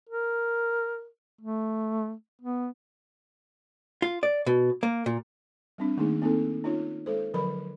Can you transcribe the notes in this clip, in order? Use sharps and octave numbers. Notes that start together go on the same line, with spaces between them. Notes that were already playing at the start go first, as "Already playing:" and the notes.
A#4
A3
B3
F4
D5
B2
A#3
A#2
G3 C4 D4
D#3 A3 A#3 D#4 G#4
A#3 C4 D#4 A4
C#4 D#4 F4 C#5
G#3 A4 C5
D3 F3 F#3 A#4 B5